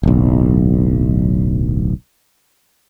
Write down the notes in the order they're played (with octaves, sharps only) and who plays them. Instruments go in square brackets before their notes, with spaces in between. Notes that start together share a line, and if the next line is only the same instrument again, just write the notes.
[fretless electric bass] D1 B1